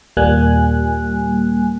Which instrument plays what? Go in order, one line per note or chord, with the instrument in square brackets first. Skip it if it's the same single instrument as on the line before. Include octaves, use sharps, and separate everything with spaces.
[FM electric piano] D#2 A#2 G3 A#3 G#5 F#6